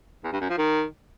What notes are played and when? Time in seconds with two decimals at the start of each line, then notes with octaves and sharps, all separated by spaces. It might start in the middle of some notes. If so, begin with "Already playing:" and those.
0.24 E2
0.32 G2
0.41 F#2
0.49 F3
0.58 D#3